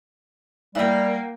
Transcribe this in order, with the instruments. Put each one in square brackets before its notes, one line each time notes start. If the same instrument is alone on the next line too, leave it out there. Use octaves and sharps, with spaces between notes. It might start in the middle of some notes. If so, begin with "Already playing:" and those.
[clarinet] G3 [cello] A#3 [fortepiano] E4 E5 [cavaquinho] F#5 G5